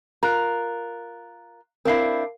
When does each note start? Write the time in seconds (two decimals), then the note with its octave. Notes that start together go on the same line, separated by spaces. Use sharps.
0.23 F4 A#4 A#5 F#6
1.85 C4 D4 E4 A#4 F5 C7